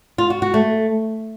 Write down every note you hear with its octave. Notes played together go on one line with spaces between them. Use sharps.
F4
F#4
F#4
A3